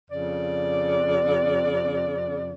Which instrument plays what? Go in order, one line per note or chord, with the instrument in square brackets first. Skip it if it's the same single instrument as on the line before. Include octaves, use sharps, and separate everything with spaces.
[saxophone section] F2 C#3 D5